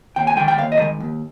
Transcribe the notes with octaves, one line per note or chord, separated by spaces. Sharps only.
D#2 G5
G#5
D#3 G#3 G5
G5
D#2 F5
D#5
D#3 G#3
D#2